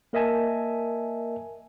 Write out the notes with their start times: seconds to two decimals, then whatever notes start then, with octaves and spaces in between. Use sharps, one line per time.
0.13 A#3 A#4 D#5 E5 G#5 A5